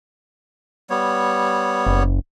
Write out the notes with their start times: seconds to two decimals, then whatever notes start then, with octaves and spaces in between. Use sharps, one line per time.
0.90 G3 B3 C#5
1.87 F#1